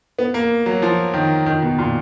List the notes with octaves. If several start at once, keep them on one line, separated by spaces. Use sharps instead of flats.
B3
A#3
F#3
F3
D#3
D#3
B2
A#2